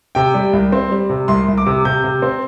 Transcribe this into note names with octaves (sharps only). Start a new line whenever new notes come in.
C3 G5
G3
C2
C4
G3
C3
C2 C6
C2
D6
C3
C3 G6
C3
C4